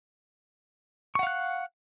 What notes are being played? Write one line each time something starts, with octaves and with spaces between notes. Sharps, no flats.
F5 F#5 C#6 F#6